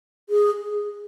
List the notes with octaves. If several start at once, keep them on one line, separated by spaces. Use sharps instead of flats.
G#4